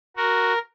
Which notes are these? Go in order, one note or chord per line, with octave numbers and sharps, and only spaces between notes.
F#4 A#4